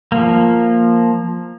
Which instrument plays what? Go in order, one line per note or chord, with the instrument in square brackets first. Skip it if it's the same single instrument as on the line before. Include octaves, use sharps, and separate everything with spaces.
[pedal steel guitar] F3 A#3